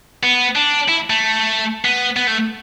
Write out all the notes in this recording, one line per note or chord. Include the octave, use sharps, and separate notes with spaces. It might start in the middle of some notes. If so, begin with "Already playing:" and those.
B3
D4
E4
A3
B3
B3
A3